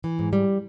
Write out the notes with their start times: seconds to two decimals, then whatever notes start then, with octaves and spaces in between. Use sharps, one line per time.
0.04 E3
0.19 G#2
0.33 G3